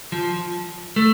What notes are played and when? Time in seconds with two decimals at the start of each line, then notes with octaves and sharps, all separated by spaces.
0.12 F3
0.96 A3